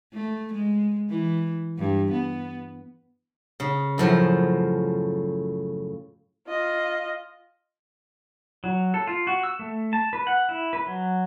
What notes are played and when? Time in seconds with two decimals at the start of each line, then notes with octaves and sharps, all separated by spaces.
0.14 A3
0.53 G#3
1.09 E3
1.78 G2
2.12 B3
3.60 C#3
3.98 F#2 A2 F3
6.48 F4 D#5
8.64 F#3
8.94 A4
9.07 F4
9.27 F#4
9.43 E6
9.59 A3
9.93 A5
10.13 B4
10.27 F#5
10.49 E4
10.73 B4
10.87 F#3